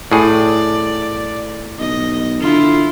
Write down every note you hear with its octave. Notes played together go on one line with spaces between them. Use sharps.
A2 G#4 D5
B1 D#5
D3 E4 F4